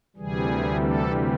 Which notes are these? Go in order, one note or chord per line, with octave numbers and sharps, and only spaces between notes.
D2 C3 E3 G3 G#4
A4